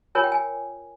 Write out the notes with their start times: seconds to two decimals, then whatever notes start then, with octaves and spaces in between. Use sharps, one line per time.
0.15 F4 A#4 C#5 G#5
0.24 G5
0.32 G#5